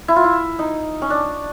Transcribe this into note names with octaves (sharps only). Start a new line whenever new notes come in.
E4
F4
E4
D#4
C#4
D4